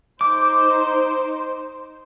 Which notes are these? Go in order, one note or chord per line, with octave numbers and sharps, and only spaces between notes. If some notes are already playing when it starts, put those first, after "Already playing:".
D#4 C5 D6